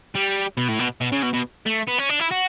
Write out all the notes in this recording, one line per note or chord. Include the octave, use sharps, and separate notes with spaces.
G3
B2
A2
B2
B2
C#3
B2
B2
A3
B3
C#4
D4
E4
F#4